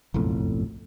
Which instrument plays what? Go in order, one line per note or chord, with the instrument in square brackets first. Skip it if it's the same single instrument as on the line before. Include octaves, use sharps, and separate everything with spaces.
[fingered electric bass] F#1 B1 F2 A2